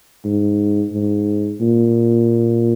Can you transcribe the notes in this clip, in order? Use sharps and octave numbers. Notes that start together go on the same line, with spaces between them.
G#2
G#2
A#2